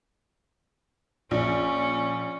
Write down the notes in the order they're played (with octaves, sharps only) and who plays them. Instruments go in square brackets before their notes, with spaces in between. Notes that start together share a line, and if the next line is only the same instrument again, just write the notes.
[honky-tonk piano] A#1 [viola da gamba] C#4